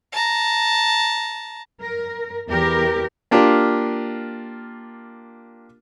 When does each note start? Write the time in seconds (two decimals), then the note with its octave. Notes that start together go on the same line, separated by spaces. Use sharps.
0.12 A5 A#5
1.82 A#4
2.50 E2 E3 G4 A#4
3.31 A#3 D4 F4 G4 A#4